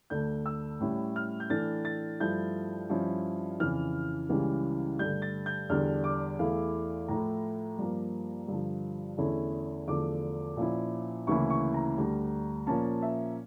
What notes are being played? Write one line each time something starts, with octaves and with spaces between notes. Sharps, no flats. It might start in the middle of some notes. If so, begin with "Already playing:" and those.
D2 D3 A3 D4 G6
E6
A2 G3 C#4 E4
F6
G6
A2 E3 A3 D4 A6
A6
G2 F3 A3 E4 G6
G2 F3 C#4 E4
F2 C#3 E3 F6
C#2 C#3 E3 G3
G2 D3 A3 G6
A6
G6
E2 D3 G3 D4 F6
D6
E2 E3 A3 E4 F5
A2 F3 A3 E4 A#5
G2 F3 A#3
G2 D3 F3
E2 D3 A3 C#4 E4
E2 D3 F3 A3 D6
A#2 F3 C#4 E4
D2 C#3 E3 A#3 E4 C#6
C#6
A#5
D2 D3 G3
A#2 F3 A#3 C#4 A5
E5